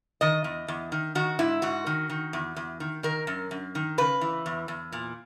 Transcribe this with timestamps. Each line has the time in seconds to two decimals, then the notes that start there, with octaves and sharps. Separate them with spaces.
0.21 D#3 D#5
0.44 E2
0.68 E2
0.92 D#3
1.15 D#3 F#4
1.39 G#2 E4
1.62 G#2 F#4
1.87 D#3
2.10 D#3
2.33 E2
2.56 E2
2.80 D#3
3.03 D#3 A#4
3.27 F#2
3.51 F#2
3.75 D#3
3.98 C#3 B4
4.21 E3
4.46 E2
4.68 E2
4.92 A#2